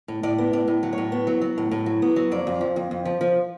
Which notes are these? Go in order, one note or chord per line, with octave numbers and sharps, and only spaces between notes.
A2
A2 D5
B3
A2 D5
A2
F#3
C#5
A2
B3
F#3
F#3
A2
A2
F#3
B3
F#3
F2 D5
F2
F3
F2
F2
F3
F3